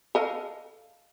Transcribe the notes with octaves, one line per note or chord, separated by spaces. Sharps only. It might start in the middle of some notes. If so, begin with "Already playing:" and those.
A4 D#5 F5